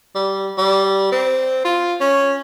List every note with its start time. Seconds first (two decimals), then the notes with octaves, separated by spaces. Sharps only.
0.15 G3
0.58 G3
1.12 C4
1.65 F4
2.01 C#4